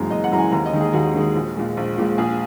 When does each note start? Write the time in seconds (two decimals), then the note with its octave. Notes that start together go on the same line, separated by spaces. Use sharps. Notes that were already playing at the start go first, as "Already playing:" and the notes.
Already playing: F#1 F#2 E3 G#3 A#5
0.10 F#1 D#5
0.24 F#5
0.31 F#2 E3 G#3 A#5
0.39 G#5
0.52 D#2 A#5
0.65 D#5
0.73 D#3 G#3
0.80 G#4
0.93 D#2 F#4
1.15 D#3 G#3
1.35 A#1
1.56 A#2 G#3
1.77 A#1
1.98 A#2 G#3
2.18 A#1 G#4